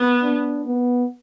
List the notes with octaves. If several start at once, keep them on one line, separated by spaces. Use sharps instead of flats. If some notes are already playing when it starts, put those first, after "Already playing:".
Already playing: B3
D4
B3